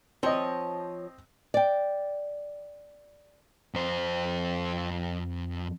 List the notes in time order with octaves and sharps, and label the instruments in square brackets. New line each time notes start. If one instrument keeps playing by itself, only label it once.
[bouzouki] F3 C#5 [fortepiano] C4 D#5
[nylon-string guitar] D5 G5
[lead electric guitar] F2 C5